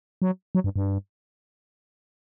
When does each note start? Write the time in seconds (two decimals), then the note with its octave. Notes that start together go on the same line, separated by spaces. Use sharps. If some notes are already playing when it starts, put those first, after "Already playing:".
0.22 F#3
0.55 F#3
0.64 G2
0.76 G2